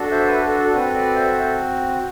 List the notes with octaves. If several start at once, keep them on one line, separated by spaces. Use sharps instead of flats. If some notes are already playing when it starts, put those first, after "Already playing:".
Already playing: D4 F#4 A4
C5 E5
B4
A4
A4
C4 F#4 A4 B4
B4 D5
C5 E5